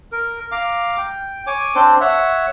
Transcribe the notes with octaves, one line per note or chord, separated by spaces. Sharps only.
A#4
F5 A#5 D6
G5
C#5 G#5 D6
C4 D4 C5
C#5 E5 F#5